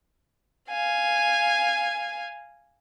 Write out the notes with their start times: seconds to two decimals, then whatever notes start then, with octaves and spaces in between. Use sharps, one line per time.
0.70 F5 G#5